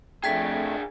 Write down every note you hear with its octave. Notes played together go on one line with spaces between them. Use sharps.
F2 A3 D4 G#4 G5 G#6 B6